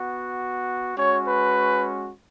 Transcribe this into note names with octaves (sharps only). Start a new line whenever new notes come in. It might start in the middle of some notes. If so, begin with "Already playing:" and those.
Already playing: B3 F#4
G#3 C#4 F#4 C#5
B4